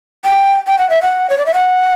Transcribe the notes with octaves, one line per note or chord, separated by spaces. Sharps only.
G5
G5
F#5
E5
F#5
C#5
D5
E5
F#5